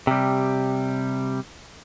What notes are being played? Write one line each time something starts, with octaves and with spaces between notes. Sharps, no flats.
C3 G3